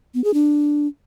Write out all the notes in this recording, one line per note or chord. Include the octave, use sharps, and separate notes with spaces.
B3
G#4
D4